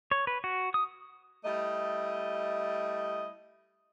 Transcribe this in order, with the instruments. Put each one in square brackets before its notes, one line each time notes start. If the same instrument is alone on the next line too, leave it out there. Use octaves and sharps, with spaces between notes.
[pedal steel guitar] C#5
B4
F#4
D#6
[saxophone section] G3 A3 E4 D#5